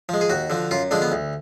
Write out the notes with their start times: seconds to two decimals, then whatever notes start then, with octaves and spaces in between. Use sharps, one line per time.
0.09 F3 G#3
0.21 G#4
0.30 D#2 F#4
0.50 D3 F3
0.71 F#2 F4
0.91 D3 F3 G#3 D4
1.02 B3
1.12 D2